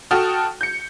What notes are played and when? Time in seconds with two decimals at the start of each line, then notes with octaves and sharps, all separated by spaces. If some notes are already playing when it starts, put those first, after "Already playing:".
0.11 F#4 A4 G5 A5 D#6 F6
0.61 G6 C#7